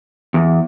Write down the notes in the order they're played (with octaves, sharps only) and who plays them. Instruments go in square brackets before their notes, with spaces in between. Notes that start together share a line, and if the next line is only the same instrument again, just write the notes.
[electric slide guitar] E2